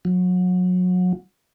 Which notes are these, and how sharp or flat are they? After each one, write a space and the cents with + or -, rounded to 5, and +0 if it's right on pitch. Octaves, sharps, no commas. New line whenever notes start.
F#3 -30